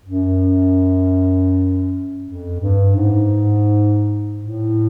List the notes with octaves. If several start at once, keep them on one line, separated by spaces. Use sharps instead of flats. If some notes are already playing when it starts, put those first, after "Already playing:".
F#2
F2
G2
G#2
A2